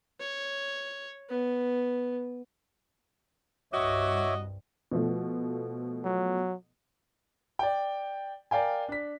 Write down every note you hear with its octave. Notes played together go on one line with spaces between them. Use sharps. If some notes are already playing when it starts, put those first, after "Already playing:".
C#5
B3
C2 G2 F#4 C#5 D#5 E5 D6
B2 F3 A3
F#3
D5 G5
A#4 D5 F5 G5 G#5
D4 B6